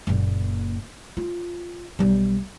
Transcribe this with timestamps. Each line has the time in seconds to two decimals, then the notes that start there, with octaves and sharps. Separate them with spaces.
0.07 F#1 A#2
1.17 F4
1.99 B1 G3